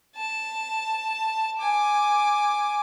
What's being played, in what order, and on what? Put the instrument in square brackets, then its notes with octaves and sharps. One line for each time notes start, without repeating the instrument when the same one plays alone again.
[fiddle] A5
G#5 D6